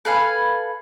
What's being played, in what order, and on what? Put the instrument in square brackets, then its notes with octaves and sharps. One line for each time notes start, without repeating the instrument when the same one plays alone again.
[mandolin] A4 B4 F5 G#5